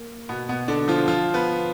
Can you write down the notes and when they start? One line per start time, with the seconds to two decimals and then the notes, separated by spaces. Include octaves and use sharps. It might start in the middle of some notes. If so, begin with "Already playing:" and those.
Already playing: A#3
0.29 B2 B3
0.49 B2 B3
0.68 D3 D4
0.88 F3 F4
1.08 F3 F4
1.34 B3 B4